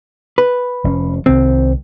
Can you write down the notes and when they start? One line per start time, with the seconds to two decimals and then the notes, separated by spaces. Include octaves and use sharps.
0.38 B4
0.84 F1 F3 C#4
1.26 C2 D#3 C4